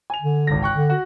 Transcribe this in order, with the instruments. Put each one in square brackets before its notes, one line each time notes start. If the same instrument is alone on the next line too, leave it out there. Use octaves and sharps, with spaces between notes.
[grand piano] G#5 F7
[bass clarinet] D3
[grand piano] G#1 C#2 A#6
G5 C#6 F#6
[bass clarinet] D3
[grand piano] F#4